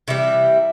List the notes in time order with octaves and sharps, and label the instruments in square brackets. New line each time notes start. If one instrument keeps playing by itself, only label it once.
[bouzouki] C3 E3 G3 E4